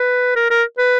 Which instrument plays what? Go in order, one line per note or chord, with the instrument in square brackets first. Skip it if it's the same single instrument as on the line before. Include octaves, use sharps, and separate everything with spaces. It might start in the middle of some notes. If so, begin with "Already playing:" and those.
Already playing: [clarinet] B4
A#4
A#4
B4